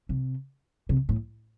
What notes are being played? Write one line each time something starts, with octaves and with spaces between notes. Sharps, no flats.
C3
C3
A2